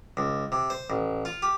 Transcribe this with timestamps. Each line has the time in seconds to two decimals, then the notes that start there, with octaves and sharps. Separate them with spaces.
0.17 C#2
0.52 C3
0.70 C5
0.90 A1
1.25 F4
1.42 G4